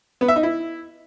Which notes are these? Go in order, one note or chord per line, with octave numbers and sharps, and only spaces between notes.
B3
E5
D#4
E4